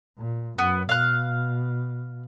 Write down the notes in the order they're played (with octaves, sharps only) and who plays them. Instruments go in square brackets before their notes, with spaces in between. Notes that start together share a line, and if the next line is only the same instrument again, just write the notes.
[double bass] A#2
[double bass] F#2 [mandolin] B3
[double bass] B2 [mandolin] F5 F#6